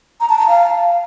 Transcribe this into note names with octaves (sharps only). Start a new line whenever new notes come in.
A#5
A5
A#5
F5